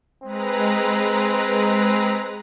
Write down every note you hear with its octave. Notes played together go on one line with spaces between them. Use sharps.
G#3 C4 B4 A#5